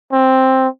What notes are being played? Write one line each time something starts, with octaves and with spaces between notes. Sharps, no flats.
C4